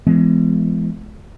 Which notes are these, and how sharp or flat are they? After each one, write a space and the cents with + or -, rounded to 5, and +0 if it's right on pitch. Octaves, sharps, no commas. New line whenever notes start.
E3 +45 G#3 +15 B3 +25